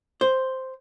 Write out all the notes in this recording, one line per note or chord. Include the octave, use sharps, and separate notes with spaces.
C5